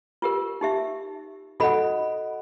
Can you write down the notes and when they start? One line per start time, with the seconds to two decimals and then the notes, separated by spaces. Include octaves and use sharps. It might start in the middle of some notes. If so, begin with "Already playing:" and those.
0.22 F4 G4 A#4
0.61 D#4 G4 E5
1.60 F#4 A4 D#5 F#5 B5